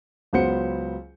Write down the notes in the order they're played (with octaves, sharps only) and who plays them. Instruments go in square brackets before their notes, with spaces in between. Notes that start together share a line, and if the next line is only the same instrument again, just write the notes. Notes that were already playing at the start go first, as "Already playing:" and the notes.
[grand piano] C#2 F#3 B3 C5 F#5 C#7